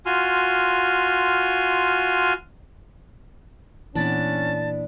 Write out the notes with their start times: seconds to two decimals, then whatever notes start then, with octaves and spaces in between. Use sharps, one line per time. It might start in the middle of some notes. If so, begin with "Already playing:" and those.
0.06 F4 F#4 G#5 C6 F6
3.95 A#2 E3 B3 C#4 D4 A5